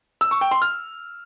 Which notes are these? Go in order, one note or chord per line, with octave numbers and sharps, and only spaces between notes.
E6
C#6
G5
C6
F6